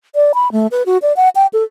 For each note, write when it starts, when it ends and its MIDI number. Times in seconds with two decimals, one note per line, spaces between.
0.15 0.32 74
0.34 0.51 83
0.52 0.67 57
0.71 0.83 71
0.86 0.98 66
1.02 1.15 74
1.16 1.29 78
1.35 1.46 79
1.53 1.63 69